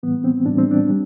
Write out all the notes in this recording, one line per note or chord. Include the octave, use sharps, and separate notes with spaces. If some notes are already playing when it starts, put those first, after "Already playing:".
A2 E3 G3 B3
C4
A2 E3 G3 D4
C4
D4
G3